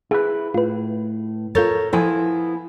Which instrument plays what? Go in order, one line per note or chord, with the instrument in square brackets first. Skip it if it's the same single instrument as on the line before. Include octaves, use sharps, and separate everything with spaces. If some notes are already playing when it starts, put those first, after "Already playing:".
[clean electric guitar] E4 B4 [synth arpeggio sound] G#4
[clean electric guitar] A2 [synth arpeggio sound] F4 B4
[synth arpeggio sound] F4 G6 A6 [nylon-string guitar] A4 A#4 C#5
[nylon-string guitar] F3 E4 [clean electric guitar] B3 G#5